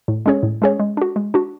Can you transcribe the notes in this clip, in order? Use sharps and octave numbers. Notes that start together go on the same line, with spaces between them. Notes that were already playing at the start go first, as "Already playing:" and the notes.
A2
G#3 C#4 G#4 C#5
A2
G#3 C#4 G#4 C#5
G#3
D4 F#4
G#3
D4 F#4